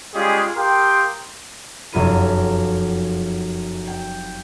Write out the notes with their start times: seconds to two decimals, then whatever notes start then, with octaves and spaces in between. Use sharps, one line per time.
0.14 G3 G#3 C#4 F4 G4 G#4
0.56 G4 A#4 F5 G5 C6 D#6
1.92 F1 F#2 F4 B4 D#7
3.87 G5